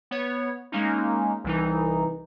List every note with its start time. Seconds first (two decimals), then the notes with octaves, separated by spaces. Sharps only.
0.11 B3 C#5
0.72 G#3 A#3 C#4 D#4
1.44 C2 E3 D#4